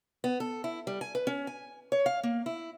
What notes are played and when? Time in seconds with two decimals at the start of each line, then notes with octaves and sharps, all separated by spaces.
0.24 B3
0.40 A4
0.64 E4
0.87 G3
1.01 G#5
1.15 B4
1.27 C#4
1.47 G#5
1.92 C#5
2.06 F5
2.23 A#3
2.46 E4